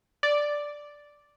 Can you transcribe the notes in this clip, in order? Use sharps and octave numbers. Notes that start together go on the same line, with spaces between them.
D5